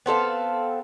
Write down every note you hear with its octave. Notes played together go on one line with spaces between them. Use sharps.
B3 C4 A4 F5